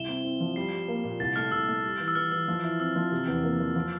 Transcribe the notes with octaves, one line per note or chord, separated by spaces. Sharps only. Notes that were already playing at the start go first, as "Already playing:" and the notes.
Already playing: C2 E4 E7 G7
C4
C4
F3
G3 C7
G3
A#3
A#2
C2 A6
A3 F6
C2 E6
A3
G3
E3
E6
E3 F6
E3 E6
F3
E4
C4 E6
F3
C3
E2
A#3
F3
F3